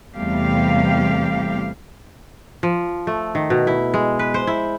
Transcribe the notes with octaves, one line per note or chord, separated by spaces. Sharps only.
E2 C3 G3 A3 G4 F5
F3
A3
D#3
B2
E4
G#3
B4
C5
E4